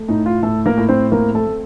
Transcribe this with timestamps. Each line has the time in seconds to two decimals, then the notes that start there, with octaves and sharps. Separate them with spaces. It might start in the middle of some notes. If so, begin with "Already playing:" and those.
Already playing: A3
0.08 A2 D#4
0.26 F4
0.43 A2 A3 A4
0.66 A#3 A#4
0.78 A2
0.89 C4 C5
1.12 A#3 C4 A#4
1.35 A3 A4
1.47 A3